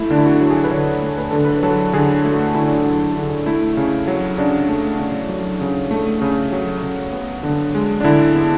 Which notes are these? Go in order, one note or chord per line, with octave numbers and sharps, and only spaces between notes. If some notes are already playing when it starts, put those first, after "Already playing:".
Already playing: A3 E4
D3 D4
E4
F#4
F#3 F#4
G#4
A4
B4
D3 C#5
A3
B4
D3 A4
B4
F#3 A4
D3 G#4
A3 F#4
D3 E4
D4
E4
F#3
D3
A3 E4
C#3
F#3
C#3 D4
A3
C#3
F#3
C#3
A3
C#3
F#3
C#3
B3
D3
G#3
D4
D3 E4
B3